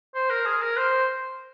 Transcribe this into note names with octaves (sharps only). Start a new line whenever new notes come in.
C5
A#4
G#4
A#4
C5